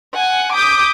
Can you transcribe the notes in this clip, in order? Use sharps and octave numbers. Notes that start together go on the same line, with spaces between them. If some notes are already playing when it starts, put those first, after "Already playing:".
F#5 G#5
D6 D#6 G6 B6